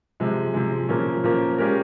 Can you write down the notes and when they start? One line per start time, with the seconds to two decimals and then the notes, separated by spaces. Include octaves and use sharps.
0.20 C3 F3 G#3
0.54 C3 F3 G#3
0.89 A#2 F3 A#3 C#4
1.24 A#2 F3 A#3 C#4
1.58 G#3 C#4 G4 A#4